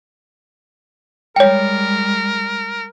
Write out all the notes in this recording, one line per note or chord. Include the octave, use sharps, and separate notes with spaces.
G3 G#3 A#4 C#5 G5